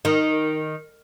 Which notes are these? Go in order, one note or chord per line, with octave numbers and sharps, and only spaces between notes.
D#3